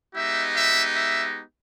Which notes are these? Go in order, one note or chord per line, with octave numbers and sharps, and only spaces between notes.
G#3 B3 D#4 G4 E5
E5
E5